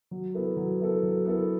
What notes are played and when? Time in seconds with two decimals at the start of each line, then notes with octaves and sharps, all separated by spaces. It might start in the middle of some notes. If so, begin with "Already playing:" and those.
0.11 F#3
0.34 B3 E4 A4
0.57 F#3
0.80 B3 E4 A4
1.03 F#3
1.25 B3 E4 A4